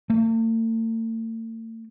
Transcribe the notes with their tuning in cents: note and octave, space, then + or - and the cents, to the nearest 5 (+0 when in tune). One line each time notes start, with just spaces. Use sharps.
A3 +45